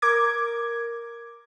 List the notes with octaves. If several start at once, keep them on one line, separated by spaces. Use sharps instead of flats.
A#4 D6 G#6